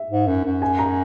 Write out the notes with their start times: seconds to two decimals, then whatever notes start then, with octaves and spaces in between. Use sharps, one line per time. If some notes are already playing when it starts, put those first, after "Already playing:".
Already playing: E5
0.11 G#2
0.28 F#2
0.45 F#2
0.62 G#5
0.79 A#5